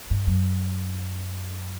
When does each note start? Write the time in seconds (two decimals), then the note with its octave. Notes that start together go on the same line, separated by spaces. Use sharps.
0.10 G2
0.27 F#2